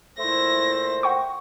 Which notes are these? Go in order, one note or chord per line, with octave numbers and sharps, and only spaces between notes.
A#2 A3 E4 C5 A#6
F#5 G5 C#6